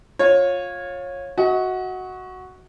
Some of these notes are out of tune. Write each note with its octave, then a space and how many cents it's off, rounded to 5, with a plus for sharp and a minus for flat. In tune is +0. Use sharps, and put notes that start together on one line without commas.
F4 +20 C#5 -15
F#4 +0 D#5 +40